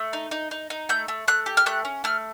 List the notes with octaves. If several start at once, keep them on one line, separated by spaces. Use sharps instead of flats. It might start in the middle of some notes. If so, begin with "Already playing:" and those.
Already playing: A3
D#4
D#4
D#4
D#4
A3 G6
A3
A3 F#6
G4
F6
A3 F#6
C#4
A3 F6